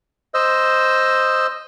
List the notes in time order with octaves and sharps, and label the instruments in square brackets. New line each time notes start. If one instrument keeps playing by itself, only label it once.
[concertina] C5 D#5 E6